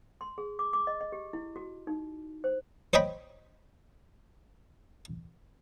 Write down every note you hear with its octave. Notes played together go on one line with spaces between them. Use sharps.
C6
G#4
D6
D6
D#5
D#5
G4
E4
F#4
D#4
C5
C5 C#5 D#5 G5 B5